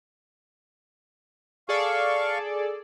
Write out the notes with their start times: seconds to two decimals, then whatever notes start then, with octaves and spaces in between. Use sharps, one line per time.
1.69 G#4 A4 D5 F5 C#6